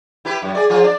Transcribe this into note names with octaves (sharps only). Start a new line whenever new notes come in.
E4 G4 B4
F#2
G#4 D5
F3 F4 G#4
D4 D5